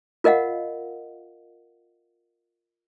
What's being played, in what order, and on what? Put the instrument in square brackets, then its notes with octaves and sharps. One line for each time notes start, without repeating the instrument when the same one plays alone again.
[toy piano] F4 A#4 D#5 F5 F#5